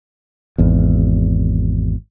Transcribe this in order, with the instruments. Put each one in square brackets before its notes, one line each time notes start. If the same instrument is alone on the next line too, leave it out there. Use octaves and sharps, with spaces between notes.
[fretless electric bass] G#1 E2